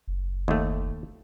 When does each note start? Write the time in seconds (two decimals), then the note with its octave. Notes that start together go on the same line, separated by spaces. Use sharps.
0.07 F#1
0.48 D#2 A3